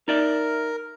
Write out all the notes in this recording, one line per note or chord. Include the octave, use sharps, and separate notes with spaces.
D#4 A#4 D5 E5